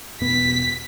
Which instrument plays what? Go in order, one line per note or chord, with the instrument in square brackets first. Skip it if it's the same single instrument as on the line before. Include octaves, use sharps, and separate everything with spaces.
[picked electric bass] E1 B2 B3 [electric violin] B6